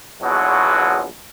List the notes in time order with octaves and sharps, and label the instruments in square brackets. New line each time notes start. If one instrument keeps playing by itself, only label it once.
[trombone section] A#1 E2 B2 D3 F#3